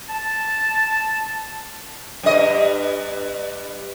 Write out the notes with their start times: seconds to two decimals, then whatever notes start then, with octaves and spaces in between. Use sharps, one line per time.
0.09 A5
2.23 G2 D#5